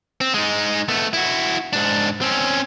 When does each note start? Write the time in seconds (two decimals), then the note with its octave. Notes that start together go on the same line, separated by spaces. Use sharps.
0.21 C4
0.34 G#3 D#4
0.88 A3 B3
1.13 E4 F#4
1.73 G#2 D4
2.21 C4 C#4